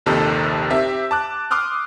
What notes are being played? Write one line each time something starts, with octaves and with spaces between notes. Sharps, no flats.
A#1 D#2 C3 D#3 A4 A#4
C4 G4 E5
A5 D6 F#6
C6 D6 D#6 F6 F#6